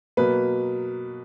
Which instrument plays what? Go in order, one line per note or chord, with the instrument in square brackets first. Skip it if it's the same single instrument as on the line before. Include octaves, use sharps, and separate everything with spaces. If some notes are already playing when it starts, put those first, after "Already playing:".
[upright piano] B2 F#3 A#3 B4